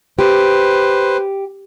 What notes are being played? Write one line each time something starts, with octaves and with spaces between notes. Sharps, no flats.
G4 B4 C5